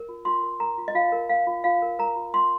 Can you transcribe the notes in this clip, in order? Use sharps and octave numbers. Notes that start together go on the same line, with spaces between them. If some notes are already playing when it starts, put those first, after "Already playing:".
Already playing: A#4
F4
F4 C6
A#4
A#4 A#5
F4
D#5
F4 F5
A#4
A#4 F5
F4
F4 F5
A#4
A#4 A#5
F4
F4 C6